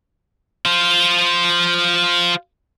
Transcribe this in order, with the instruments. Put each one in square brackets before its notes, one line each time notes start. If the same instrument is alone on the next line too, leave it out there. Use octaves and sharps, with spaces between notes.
[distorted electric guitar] F4 C5